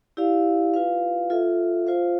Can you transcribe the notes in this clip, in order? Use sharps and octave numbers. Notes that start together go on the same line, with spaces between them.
E4 G4 D5 F5
F4 B4 F5
F4 A4 E5
F4 C5 F5